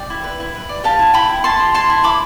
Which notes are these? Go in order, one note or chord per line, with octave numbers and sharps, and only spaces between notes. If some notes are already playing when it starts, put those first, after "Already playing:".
Already playing: D5 G5
E4
B4
E4
B4
D5
G4 F5 A5
E4
E4 G5 B5
E4
E4 A5 C6
G4
E4 A5 C6
E4
E4 B5 D6